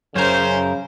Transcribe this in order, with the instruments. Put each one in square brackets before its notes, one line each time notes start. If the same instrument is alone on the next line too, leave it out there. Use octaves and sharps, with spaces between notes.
[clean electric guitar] F#2 A#4 [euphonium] C#3 [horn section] C#4 C5